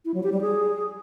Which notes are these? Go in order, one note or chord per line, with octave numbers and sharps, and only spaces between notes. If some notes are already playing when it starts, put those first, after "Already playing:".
E4
F#3
G4
G3
G#4